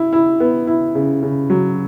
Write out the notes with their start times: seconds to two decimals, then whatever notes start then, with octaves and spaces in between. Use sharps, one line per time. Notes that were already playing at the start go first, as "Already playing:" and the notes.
Already playing: E4
0.13 E4
0.40 B3
0.67 E4
0.95 C#3
1.23 C#3
1.50 F#3